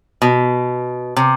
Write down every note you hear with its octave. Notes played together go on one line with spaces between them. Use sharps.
B2
C3